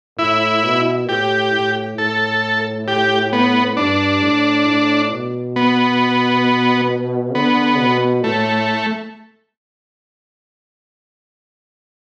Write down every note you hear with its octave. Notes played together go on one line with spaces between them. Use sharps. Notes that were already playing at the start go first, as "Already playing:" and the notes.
A2 E4
B2
A2 G4
A2
A2 A4
G4
B3
G2 D4
A2
A2
B2
B3
D3 B3
B2
A2 A3